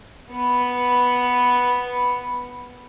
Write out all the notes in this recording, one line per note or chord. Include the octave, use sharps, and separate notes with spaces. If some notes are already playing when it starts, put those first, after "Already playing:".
B3 B4